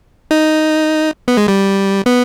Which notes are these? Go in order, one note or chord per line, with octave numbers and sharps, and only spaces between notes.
D#4
B3
G#3
G3
B3